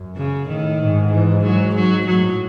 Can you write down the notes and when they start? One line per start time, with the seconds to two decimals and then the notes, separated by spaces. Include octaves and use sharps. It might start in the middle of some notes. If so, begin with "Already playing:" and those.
Already playing: F#2
0.16 C#3
0.48 A2 D#3
0.80 G#2
1.11 E3
1.43 F#3
1.75 F#3
2.06 A2 F#3